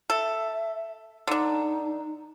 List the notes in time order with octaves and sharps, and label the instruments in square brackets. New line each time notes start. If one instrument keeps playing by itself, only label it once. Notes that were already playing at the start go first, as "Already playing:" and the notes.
[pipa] A4 [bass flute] E5
[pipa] D3 D4 [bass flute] D#4